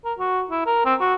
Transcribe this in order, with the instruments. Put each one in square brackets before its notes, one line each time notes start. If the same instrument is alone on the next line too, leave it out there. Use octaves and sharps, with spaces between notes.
[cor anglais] A#4
F#4
E4
A#4
C4
F#4